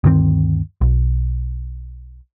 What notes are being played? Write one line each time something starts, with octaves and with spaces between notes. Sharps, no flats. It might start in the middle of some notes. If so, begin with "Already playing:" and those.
D2 G2 D#3 C4
B1